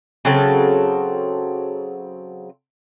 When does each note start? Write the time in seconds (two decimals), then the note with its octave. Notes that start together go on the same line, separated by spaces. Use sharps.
0.25 C#3 F#3 C4 A4